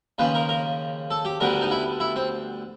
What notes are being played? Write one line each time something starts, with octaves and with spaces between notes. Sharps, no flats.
D#2 C#3 F3 B4
A#4
A#4
A4
G4
D2 D3 G3 B3 A#4
D#4
E4
E4
C4